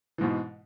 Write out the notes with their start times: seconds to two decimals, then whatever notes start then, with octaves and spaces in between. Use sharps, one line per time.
0.18 E3
0.21 G#2
0.24 B2